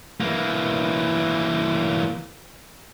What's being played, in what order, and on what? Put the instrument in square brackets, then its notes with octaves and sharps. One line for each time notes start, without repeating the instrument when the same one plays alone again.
[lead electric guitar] E3 A#3